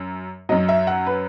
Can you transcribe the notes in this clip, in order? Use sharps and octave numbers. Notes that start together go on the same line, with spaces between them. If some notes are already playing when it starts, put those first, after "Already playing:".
Already playing: F#2
F#2 F#3 D#5
E5
F#5
B4